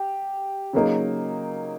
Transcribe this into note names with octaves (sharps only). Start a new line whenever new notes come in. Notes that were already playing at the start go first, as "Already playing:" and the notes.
Already playing: G4
C#3 F#3 A#3 D#4